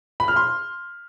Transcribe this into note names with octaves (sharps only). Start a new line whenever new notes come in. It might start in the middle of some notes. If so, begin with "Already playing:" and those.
B5
F6
C6